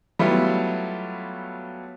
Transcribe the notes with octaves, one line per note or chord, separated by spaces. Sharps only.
F#3 G3 A3 B3 E4 F4